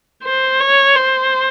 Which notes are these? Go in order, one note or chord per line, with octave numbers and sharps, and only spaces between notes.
C5
C#5
C5